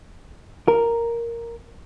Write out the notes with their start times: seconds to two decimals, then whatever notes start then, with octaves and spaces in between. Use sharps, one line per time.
0.68 A#4